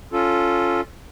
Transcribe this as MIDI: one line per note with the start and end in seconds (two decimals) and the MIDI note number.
0.13 0.81 61
0.13 0.81 65
0.13 0.81 69